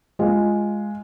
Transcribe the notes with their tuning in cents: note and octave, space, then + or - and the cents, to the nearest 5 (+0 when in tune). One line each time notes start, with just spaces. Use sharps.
G#3 +0 F4 +0